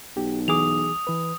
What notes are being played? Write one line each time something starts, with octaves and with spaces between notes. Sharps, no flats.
B1 G4
E3 G#4 D6 D#6 F7
E3 B4